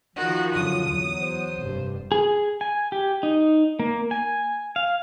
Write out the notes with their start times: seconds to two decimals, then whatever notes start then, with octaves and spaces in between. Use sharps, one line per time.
0.16 D#3 F3 F#4
0.53 F#2 D3 F#3 D#6
0.87 E2 F#3
1.20 C5
1.59 F1 G2 G3
2.12 G#4
2.61 G#5
2.92 G4
3.23 D#4
3.79 A#3
4.11 G#5
4.76 F5